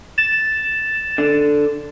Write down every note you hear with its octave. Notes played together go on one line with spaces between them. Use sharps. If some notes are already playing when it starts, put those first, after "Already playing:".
A6 E7
D3